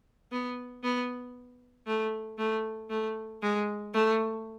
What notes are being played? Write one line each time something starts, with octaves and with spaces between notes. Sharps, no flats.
B3
B3
A3
A3
A3
G#3
A3